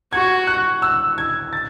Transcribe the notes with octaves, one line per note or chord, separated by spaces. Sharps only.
F#4 G#6
F#6
E6
G#6
A6